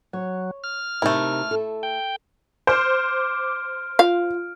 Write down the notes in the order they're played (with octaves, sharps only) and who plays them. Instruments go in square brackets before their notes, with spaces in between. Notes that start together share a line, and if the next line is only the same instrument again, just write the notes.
[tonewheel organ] F#3 [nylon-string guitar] C#5
[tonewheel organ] F6
[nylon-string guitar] C3 D#4 A#4 [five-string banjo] A3 E4
[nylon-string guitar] A4
[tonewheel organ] G5
[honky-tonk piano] C5 [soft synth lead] D6 [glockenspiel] F6 D7
[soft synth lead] F4 [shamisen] F5